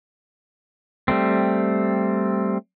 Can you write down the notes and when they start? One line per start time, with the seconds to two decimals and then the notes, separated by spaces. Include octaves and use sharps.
1.08 G3 A3 C4